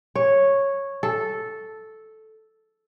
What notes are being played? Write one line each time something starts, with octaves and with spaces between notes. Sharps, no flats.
C#5
A4